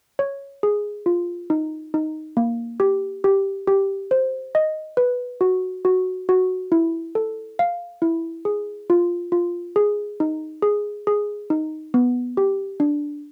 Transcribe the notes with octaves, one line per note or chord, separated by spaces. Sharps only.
C#5
G#4
F4
D#4
D#4
A#3
G4
G4
G4
C5
D#5
B4
F#4
F#4
F#4
E4
A4
F5
E4
G#4
F4
F4
G#4
D#4
G#4
G#4
D#4
B3
G4
D4